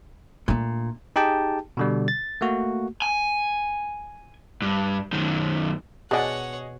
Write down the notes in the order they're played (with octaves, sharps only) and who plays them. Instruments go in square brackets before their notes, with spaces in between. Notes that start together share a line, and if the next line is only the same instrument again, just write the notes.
[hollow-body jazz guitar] A#2 [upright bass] A3 D4
[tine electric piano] D#4 G4 G#4 G5 A5
B2 D3 G3
A6
A3 A#3 F#4
[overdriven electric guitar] G#5
G2
F#2 D#3
[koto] B2 [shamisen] F#3 D4 [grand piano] G#4 D#5 G#5 [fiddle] C#5 F#5